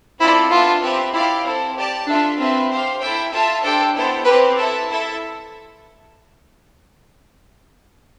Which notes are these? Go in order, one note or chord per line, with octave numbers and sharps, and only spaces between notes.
C4 E4 F4 A4 D5
B3 D4 F4 A4 E5 A5
C4 G4 B4 E5
E4 G4 D5 F5
C4 E4 A4
G4 D5 A5
D4 F4 A4 E5
C4 F4 B4 E5
G4 C5 F5
E4 A4 E5 G5
F4 A4 E5 A5
D4 G4 A4 C5 G5
B3 E4 A4 C5 G5
C4 E4 G4 B4
E4 A4 E5 A5
E4 A4 E5